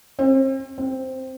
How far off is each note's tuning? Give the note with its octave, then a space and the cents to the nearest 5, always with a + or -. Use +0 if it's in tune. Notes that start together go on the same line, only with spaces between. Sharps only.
C4 +40
C4 +0